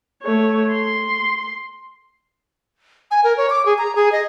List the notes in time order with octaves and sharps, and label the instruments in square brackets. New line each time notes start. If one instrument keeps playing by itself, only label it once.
[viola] A3 C#5
C6
[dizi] G#5
A#4
C#5
D6
G#4
A#5
G#4
D#5